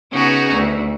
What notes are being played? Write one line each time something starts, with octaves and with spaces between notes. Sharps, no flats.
C#3 B3 D#4 F#4 G#4
D2